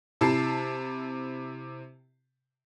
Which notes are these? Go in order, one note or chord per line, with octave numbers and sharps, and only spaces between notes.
C3 E4 A5 C7